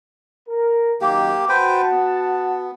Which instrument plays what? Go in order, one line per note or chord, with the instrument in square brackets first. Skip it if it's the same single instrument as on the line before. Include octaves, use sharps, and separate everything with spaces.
[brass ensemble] A#4
[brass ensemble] F#2 D#3 [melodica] A#3 G4
[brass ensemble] F#4 F#5 A5 [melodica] B4 C5 G5
[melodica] B3